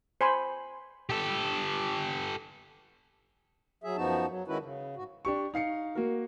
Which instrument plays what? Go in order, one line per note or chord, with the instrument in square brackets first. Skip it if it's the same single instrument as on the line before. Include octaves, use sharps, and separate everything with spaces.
[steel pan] C5 G#5 B5 C6
[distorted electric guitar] G4 A4
[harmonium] F#3 G#4 E5
F#2 F3 B3 D#4 F#4 A5
F#3
D#3 G#3 C#4 E4 F#4 B4
C#3
G#2 F#4
[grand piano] D4 G4 C#6
D#4 F5 C7 C#7
A#3 F#4 A#4